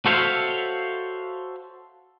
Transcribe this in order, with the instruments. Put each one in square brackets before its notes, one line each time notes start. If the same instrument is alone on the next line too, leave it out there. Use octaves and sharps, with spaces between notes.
[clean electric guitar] F#4 A4 C5 C#5 E5 F5